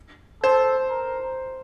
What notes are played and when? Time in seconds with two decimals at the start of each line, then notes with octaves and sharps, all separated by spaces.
0.43 A4 C5
0.90 A#4